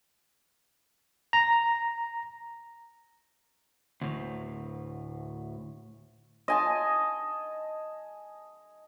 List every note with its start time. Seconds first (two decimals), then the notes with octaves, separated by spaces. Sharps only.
1.33 A#5
4.01 D2 A2
6.48 D#5 G#5 A5